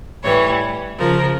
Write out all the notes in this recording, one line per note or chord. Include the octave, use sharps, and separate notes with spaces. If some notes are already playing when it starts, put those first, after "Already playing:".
A2 E3 G3 C#5
C#3 F3 A#4